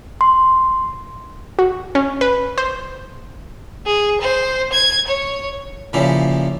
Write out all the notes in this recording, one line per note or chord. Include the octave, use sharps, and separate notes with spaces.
C6
F#4
C#4
B4
C5
G#4
C5
G#6
C#5
A#2 C#3 E3 F3 E4 G4